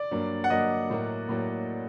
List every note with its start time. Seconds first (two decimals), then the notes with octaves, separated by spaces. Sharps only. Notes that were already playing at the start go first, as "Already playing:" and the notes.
Already playing: D5
0.11 G2 F#3 A#3
0.44 F#5
0.50 G2 F#3 A#3 D#5
0.90 A2 F#3 A#3
1.29 A2 F#3 A#3